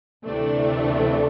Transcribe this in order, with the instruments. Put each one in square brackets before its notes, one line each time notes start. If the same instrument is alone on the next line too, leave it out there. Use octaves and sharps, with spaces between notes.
[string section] D2 C3 E3 A3 D4